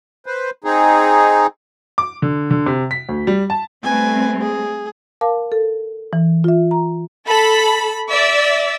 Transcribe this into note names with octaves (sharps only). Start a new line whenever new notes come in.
B4 C5
C4 D#4 G#4
D6
D3
D3
C3
B6
D2
G3
A5
G3 A3 C4 B4 G#5
G#4
A#4 F5 A5 D6
A4
E3
F4 E5
A#5
A4 B5
D5 E5